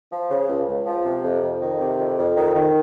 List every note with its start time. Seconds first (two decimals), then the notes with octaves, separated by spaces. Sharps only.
0.12 F3
0.30 C#3
0.49 C#2
0.68 C#2
0.87 F3
1.06 C3
1.24 F2
1.42 F2
1.62 D#3
1.81 C3
1.99 F2
2.19 F2
2.37 D#3
2.55 D#3